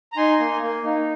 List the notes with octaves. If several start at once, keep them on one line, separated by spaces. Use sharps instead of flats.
A#5
D#4 G#5 C6
A#3
A#3
D#4